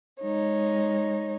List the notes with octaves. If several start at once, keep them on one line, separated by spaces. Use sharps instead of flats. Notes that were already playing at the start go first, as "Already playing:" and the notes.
G#3 D#4 C#5